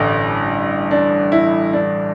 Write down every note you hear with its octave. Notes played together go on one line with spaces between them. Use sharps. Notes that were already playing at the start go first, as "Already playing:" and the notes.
Already playing: A1 G2 D3 G3
D4
E4
D4